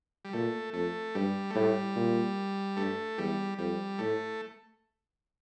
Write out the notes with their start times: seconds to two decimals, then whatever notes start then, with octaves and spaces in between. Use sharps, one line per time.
0.25 G3
0.33 A#2 A3
0.73 F2 A3
1.15 G2 G3
1.51 A3
1.55 A2 G3
1.96 A#2
2.77 G2 A3
3.18 E2 G3
3.58 F2 G3
3.99 A2 A3